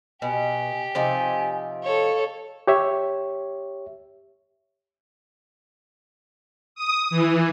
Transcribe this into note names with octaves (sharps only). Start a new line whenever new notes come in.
B2 G4 G#5
C3 F3 D#4 G#5
A4 C#5 F5
G4 C#5 E5
D#6
E3